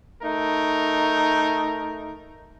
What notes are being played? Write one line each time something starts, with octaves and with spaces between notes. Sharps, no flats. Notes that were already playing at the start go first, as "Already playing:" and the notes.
A3 D#4 A#4